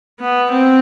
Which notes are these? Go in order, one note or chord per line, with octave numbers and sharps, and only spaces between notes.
B3
C4